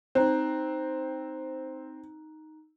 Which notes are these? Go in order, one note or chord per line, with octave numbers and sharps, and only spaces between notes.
C4 D#4 A#5 F#6